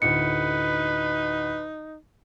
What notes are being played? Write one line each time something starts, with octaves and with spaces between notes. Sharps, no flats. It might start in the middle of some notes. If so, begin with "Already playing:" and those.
D2 A2 D#4 B4 C#7